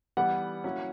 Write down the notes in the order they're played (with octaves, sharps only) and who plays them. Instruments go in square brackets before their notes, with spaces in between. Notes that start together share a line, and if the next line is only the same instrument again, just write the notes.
[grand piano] E3 G3 B3 [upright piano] F#5
[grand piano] F#3 A#3 C#4 E4